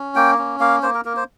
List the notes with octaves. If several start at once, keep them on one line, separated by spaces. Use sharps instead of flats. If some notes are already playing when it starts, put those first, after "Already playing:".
Already playing: C#4
A#3 G5
C#4
A#3 F5
A#3 C5
A#4
A#3 A#4
C5